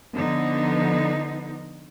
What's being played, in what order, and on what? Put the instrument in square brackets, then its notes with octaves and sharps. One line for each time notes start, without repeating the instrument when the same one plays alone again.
[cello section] D3 F3 B3 D#4